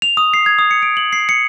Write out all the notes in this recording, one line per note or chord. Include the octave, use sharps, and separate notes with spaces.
F7
D#6
C7
G#6
D#6
C#7
D7
F#7
C7
C#7